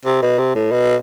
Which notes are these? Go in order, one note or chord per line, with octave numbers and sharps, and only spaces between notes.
C3
B2
C3
A2
B2